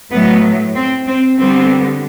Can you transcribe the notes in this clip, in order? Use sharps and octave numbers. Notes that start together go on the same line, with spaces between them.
A2 F#3 A3 B3
C4
C4
D3 G3 B3 C4